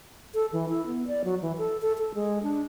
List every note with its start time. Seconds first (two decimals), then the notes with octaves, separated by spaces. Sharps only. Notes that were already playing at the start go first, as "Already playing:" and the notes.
0.34 A4
0.52 E3
0.69 E4
0.86 B3
1.07 D5
1.24 F#3
1.42 E3
1.58 A4
1.82 A4
1.98 A4
2.15 G#3
2.43 D4